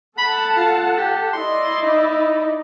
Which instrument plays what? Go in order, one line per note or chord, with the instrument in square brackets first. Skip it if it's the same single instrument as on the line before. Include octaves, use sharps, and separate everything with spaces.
[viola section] A4 F#5 A5 [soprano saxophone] B5
[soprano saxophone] F4
G4
[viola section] E4 D5 D#5 [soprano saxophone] C6
[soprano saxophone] D#4